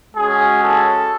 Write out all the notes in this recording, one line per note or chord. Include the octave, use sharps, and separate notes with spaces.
G#3 C#4 F#4 G#4
A4